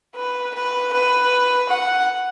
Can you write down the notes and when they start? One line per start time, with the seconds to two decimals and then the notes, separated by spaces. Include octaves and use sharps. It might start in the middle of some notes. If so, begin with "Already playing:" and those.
0.16 B4
0.55 B4
0.93 B4
1.69 F#5